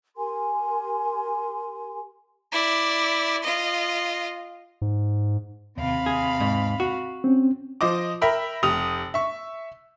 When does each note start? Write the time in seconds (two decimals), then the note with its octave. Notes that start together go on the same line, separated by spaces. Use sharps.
0.16 G4 A#4 G#5 C6
2.52 E4 D5
3.43 F4 D#5
4.82 G#2
5.78 D#2 C3 F5 B5
6.06 G#4
6.40 G#2
6.80 F#4
7.24 C4 C#4
7.81 F3 C5 D#5 D6
8.21 A#4 E5 G5 B5 E6
8.63 F1 G4 D#6 F7
9.14 E5 C#6